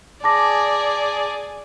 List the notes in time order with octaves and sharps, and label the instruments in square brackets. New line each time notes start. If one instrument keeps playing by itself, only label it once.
[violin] G#4 D5 [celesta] A5 D6 A#6